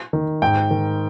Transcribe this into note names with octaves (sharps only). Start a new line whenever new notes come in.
D#3
G#2 G5
D#3